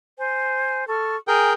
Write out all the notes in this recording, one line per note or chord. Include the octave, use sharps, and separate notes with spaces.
C5 G#5
A4 C#6 F6
G#4 A#4 G5 G#5